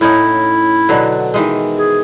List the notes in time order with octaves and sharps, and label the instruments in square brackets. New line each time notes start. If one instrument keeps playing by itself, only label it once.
[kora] A2 C#4 D#4 [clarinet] E4
[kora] B2 D3 F#3
D#3 E3 G#3
[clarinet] G#4